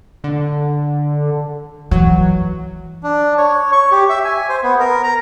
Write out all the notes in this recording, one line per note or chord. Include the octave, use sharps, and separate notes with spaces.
D3
E3 F#3
D4
C#5
C#6
G4
E5
G#5
C5
B3
A#4
A#5